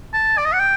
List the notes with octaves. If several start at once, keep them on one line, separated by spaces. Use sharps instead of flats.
A5
D5
D#5
F#5
G5